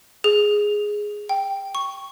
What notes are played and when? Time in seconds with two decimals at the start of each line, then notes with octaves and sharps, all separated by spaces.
0.24 G#4
1.29 G5
1.75 C#6